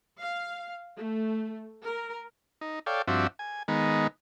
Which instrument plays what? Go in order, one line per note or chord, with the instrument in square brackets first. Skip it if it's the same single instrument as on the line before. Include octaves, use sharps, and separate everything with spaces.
[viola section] F5
A3
A#4
[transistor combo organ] D#4
A4 C#5 D5 F5 G5
G2 F3 C4 D4 F#4 E5
G#5
D#3 G#3 B3 D#4